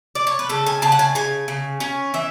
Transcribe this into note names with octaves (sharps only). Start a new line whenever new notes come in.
D5
C#5
B4
C#3 A4
G#5
C#3 A5
F#5
G#5
C#3 G#5
C#3
C#4 G#5
E3 E5